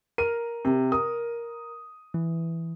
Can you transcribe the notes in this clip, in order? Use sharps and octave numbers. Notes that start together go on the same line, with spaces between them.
A#4 F6 D#7
C3
A#4 D#6
E3